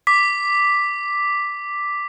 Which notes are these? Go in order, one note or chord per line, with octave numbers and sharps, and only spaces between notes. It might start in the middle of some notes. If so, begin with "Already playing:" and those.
D6 B6